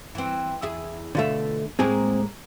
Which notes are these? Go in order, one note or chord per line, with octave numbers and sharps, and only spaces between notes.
E3 C4
E2 E4 G#4
B2 D3 A3 F4 E5
A2 G#3 A#3 C4 G#4